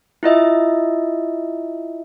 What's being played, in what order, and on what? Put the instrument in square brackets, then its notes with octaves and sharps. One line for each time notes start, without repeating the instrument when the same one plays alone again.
[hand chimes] E4 F4 D#5 E5